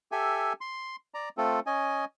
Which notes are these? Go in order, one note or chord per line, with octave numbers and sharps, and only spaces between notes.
G4 A4 E5 G#5
C6
D5 A#5
A3 C4 F4 A4
C#4 D#5 G#5